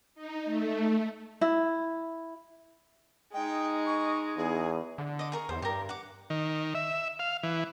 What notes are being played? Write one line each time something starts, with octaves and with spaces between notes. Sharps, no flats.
D#4
A3
E4
G#3 D#4 G5
C#6
E2 G#4
D3
D#5 D6
G#4 A#4 C#6
E2 C5
G2 G4 A#4
F#5 D6
D#3
E5
F5
E3